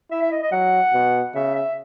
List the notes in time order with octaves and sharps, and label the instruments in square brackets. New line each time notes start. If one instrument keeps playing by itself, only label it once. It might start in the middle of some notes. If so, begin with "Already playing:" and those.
[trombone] E4 [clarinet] E5
[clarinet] E5
D#5
D#5
[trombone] F#3 [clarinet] F#5
[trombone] B2
[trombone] C#3 [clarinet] E5
[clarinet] E5